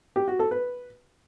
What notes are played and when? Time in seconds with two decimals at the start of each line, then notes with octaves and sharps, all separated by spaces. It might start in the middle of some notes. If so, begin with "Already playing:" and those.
0.16 G4
0.28 F#4
0.39 A4
0.51 B4